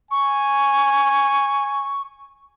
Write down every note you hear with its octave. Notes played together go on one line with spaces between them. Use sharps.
G#5 C#6